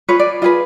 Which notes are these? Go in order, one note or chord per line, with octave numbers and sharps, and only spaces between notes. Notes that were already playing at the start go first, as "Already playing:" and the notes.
F4 G#4 B4 C#5
D5
F4 G#4 B4 D#5